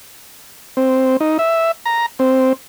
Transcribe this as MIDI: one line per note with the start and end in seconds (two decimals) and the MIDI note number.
0.77 1.17 60
1.21 1.38 63
1.39 1.71 76
1.86 2.06 82
2.19 2.53 60